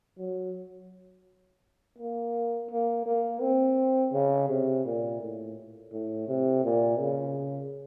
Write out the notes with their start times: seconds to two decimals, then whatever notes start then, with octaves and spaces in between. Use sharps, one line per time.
0.19 F#3
1.98 A#3
2.70 A#3
3.06 A#3
3.41 C4
4.13 C#3
4.49 C3
4.85 A#2
5.21 A2
5.92 A2
6.28 C3
6.64 A#2
7.00 C#3